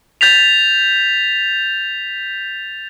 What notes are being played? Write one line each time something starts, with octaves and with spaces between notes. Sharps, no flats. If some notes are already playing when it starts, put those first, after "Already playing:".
G6 A6 B6 F7